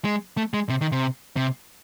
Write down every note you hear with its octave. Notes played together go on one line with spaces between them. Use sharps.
G#3
A3
G#3
C3
D#3
C3
C3